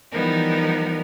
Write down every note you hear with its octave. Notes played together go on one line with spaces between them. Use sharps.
E3 F3 G3 B3 D#4 A#4